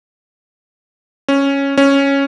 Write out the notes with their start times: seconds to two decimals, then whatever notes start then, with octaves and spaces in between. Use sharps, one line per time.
1.28 C#4
1.77 C#4